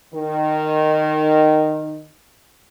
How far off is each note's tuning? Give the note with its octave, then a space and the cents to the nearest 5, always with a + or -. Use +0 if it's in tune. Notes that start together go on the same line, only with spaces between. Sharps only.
D#3 -15